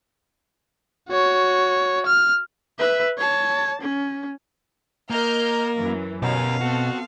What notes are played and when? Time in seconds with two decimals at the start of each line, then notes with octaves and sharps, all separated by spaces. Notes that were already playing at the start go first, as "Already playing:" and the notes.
1.09 F#4 C#5
2.06 F6
2.79 B4 E5
3.18 C#5 A5
3.82 C#4
5.10 A#3 A#4 D#5 F6 G6
5.76 F#2 E3
6.22 B2 C#4 G4 A#4 F5
6.61 B3 C4 F#4 A4